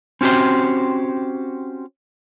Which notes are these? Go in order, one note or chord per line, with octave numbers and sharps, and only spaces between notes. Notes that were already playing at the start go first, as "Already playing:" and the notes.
C4 C#4 F#4 G4 C5